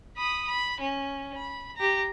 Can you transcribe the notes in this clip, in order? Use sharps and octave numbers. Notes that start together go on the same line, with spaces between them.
B5 D#6
B5
C#4
B5
G4 A#5